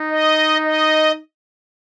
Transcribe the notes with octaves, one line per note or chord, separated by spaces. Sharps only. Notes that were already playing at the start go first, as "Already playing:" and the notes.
Already playing: D#4
D#5
D#5